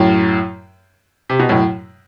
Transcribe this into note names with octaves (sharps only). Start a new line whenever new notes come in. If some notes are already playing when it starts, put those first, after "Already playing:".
Already playing: F#2 A2
C3
B2
F#2 A2